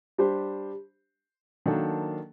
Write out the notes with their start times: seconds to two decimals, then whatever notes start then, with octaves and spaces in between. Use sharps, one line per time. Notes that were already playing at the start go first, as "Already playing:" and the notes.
0.18 G3 D4 G4 C5
1.66 D#3 F#3 A#3 D4 A4